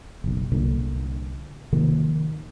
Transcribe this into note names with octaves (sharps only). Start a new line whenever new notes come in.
F#1 B1
C2 A#2 D3
C3 D#3 F3 A#3